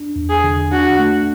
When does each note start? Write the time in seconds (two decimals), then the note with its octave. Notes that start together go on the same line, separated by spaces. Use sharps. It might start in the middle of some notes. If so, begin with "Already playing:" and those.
Already playing: D4
0.16 E2
0.29 G#4
0.44 D3
0.72 D4 F#4
0.99 A3